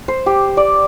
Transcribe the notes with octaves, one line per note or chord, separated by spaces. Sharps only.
C5
G4
D5